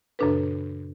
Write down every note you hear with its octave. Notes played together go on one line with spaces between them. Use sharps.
F#2 A#2 C#3 D4 A4 B4